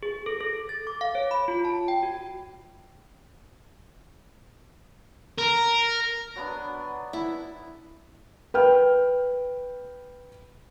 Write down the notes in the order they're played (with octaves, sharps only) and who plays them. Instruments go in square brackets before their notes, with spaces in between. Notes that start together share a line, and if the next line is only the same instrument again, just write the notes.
[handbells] G#4
A4
A4
A6
D6
F5
C#5
B5
F4
A5
G5
F#4
[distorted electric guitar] A#4
[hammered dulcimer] F#3 B3 D4
[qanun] E4
[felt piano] B4 G5 F6